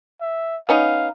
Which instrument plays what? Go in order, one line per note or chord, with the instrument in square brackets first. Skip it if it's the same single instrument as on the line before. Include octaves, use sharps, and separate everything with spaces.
[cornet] E5
[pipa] B3 C#4 D#4 [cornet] F5